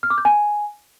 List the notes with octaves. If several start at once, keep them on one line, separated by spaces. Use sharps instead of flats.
F6
D6
G6
G#5